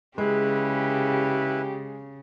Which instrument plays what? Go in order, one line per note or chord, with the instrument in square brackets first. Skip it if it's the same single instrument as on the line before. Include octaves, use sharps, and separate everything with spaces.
[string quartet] C#3 [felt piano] G#3 [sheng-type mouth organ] E4 B4 [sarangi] G4